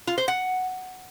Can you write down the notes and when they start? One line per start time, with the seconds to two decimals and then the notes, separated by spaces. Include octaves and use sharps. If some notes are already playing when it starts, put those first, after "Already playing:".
0.07 F4
0.18 C5
0.28 F#5